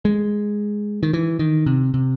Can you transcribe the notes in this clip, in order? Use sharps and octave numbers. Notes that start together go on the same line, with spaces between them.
G#3
D#3
E3
D#3
C3
C3